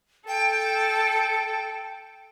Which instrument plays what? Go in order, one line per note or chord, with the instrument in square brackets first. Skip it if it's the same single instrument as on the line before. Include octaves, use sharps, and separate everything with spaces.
[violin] A4 [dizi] G5